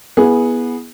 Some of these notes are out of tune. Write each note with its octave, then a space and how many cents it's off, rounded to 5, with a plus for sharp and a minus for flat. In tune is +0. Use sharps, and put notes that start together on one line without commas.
B3 -15 E4 -5 G#4 +0